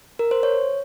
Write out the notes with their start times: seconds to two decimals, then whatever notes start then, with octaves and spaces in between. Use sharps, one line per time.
0.19 A#4
0.31 C5
0.43 C#5